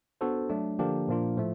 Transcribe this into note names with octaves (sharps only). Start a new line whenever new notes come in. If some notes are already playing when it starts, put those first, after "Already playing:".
B3 D4 F#4 A4 C5
F#3 A3 D4
D3 F3 A#3 D4 G4
A#2 F3 A#3 D4 F4
A2 F3 A3